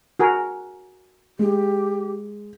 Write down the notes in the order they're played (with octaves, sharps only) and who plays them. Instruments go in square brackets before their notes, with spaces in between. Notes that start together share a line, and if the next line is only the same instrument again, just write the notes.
[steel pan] F#4 G#4 A#4
[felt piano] G#3 [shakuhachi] G4